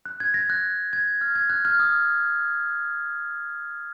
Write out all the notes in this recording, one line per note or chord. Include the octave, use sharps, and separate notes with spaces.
F#6
G#6
A#6
F#6
G#6
F6
G#6
F#6
F6
D#6